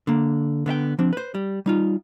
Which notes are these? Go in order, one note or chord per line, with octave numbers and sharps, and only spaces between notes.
D3 A#3
D3 B3 E5 G5
F3 C4 D4
B4 C5
G3
G3 D#4 F4